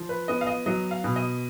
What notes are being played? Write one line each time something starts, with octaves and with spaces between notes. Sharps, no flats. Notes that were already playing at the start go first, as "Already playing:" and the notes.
Already playing: F3
B4
B3 D#5
F5
D#5
F#3 D#5
F5
B2
D#5